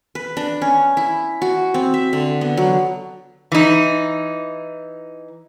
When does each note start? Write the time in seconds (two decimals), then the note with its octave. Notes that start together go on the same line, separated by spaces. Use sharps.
0.15 B4
0.37 D4
0.62 C#4
0.97 E4
1.42 F#4
1.74 C4
1.94 E5
2.13 D3
2.41 B3
2.57 F#3
3.52 E3 D#4